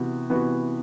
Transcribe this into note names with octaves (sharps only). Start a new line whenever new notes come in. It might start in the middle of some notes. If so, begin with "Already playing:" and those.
Already playing: C3 E3 B3 F#4
C3 E3 B3 F#4 B4